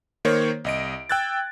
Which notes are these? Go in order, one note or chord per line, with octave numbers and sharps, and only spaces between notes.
D#3 A#3 A#4 C5 C#5
C2 D#5 D7
G5 E6 F#6 G#6 A6